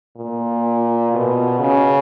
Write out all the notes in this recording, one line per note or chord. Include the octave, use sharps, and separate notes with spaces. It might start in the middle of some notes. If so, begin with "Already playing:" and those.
A#2
B2
C#3